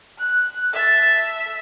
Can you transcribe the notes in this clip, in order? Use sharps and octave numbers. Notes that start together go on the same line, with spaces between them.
F#6
A4 E5 A5